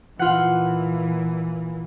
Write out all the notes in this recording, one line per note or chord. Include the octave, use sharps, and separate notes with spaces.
A#2 E3 F4 F#5